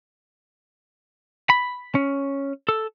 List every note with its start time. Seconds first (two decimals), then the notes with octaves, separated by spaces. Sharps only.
1.50 B5
1.95 C#4
2.69 A4